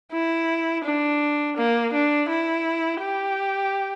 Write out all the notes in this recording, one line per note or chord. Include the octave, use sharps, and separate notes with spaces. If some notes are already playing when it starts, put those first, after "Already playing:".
E4
D4
A#3
D4
E4
G4